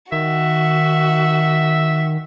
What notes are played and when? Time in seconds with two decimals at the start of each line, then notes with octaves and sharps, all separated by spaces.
0.12 D#3 F#4 E5